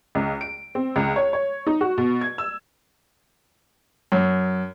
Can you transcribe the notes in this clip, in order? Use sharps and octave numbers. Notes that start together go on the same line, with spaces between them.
C#2
D7
C4
C#2
C#5
C#5
D#4
F#4
B2
G#6
E6
F#2